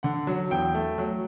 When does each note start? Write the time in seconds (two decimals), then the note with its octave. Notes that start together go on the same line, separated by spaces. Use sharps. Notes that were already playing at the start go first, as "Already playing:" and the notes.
0.03 D3 F#5
0.27 F#3
0.51 E2 G5
0.74 A3
0.98 F#3